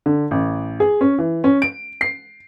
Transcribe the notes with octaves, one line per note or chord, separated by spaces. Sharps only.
D3
A1
G#4
C#4
E3
C#4
D7
C7